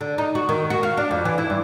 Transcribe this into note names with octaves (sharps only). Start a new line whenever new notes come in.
D3
D#4
F#4
D#3
F#4
F5
D4
F2
E3
E4
G2